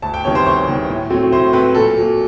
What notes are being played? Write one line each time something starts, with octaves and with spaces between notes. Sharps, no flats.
D2 A5
G5
C3 D#3 G3 B3 C#5
C5
D2 C#5
C3 D#3 G3 B3
A2
F#3 A3 C4
A2 C5
F#3 A3 C4 B4
A#2 A4
F#3 A#3